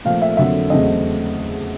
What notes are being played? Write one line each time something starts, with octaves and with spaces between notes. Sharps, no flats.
A#2 F3 A3 F5
E5
F2 D3 F#3 A#3 E5
E2 C#3 F#3 A3 C4 D#5